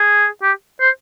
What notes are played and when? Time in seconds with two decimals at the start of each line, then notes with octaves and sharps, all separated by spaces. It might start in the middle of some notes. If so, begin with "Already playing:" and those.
Already playing: G#4
0.42 G4
0.80 C5